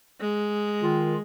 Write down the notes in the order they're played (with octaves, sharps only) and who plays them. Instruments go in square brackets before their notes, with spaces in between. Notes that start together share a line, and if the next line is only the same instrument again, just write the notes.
[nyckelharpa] G#3
[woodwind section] D#3 F4